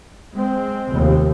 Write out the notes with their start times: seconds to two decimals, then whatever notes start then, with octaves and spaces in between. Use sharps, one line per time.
0.36 G#3 C4
0.88 F1 D#2